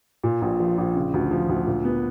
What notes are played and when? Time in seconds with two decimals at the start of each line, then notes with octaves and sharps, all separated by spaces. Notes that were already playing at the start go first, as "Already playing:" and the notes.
0.24 A#2
0.42 A#1
0.60 F3
0.78 A#1
0.96 C#3
1.14 D2
1.31 F3
1.49 D2
1.67 A#2
1.85 B3